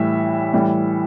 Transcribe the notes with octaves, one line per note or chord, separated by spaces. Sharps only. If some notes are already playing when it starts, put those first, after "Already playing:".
Already playing: A2 E3 G3 E5
A2 E3 G3